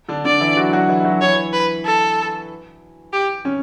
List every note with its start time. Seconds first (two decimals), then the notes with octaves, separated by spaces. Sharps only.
0.09 D3 D4
0.24 D3 D4 D5
0.40 E3 E4
0.57 F#3 F#4
0.73 F#3 F#4
0.89 E3 E4
1.00 E4
1.05 F#3 F#4
1.21 E3 E4 C#5
1.53 B4
1.85 A4
3.13 G4
3.45 C#3 C#4